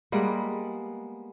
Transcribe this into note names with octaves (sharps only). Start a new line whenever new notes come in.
G3 G#3 A#3 B3